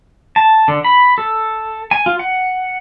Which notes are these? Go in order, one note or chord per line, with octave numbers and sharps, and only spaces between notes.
A5
D3
B5
A4
G#5
F4
F#5